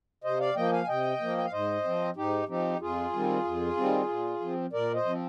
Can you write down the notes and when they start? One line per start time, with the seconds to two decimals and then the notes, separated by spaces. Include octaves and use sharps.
0.24 C3 C5 D#5
0.40 D5 F5
0.56 F3 A#3 D#5 G5
0.72 F5 G#5
0.83 G#5
0.88 C3 D#5 G5
1.20 F3 A#3
1.38 G5
1.45 F5
1.52 G#2 C5 D#5
1.84 F3 C4
2.16 G#2 D#4 G4
2.48 F3 C4 D#4 G4
2.80 F2 F4 G#4
3.13 D#3 G3 C4
3.44 F2
3.77 D#3 G3 C4
4.08 A#2
4.40 F3 C4
4.73 A#2 A#4 D5
4.94 C5 D#5
5.05 F3 C4